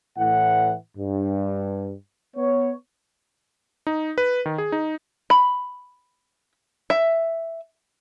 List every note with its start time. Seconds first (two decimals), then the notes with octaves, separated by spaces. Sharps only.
0.18 A2 E3 F#5
0.98 G2
2.37 B3 C#5
3.87 D#4
4.18 B4
4.46 D#3
4.58 G#4
4.72 D#4
5.30 B5
6.90 E5